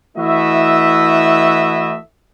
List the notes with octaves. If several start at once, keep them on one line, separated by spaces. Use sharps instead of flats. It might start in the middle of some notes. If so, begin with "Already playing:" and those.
E3 A3 E4 F#4 D#5 E5